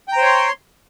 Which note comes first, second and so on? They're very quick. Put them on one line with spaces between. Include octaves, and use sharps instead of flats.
G5 A#5 C5 C#5 C6